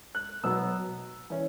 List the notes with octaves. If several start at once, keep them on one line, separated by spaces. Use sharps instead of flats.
F#6
B2 F#3 B3 E6
E3 C#4